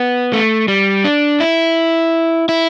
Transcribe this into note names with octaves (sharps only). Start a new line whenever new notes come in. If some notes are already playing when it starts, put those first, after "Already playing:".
Already playing: B3
A3
G3
D4
E4
E4